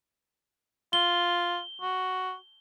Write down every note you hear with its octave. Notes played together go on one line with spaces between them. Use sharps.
F4 G7
F#4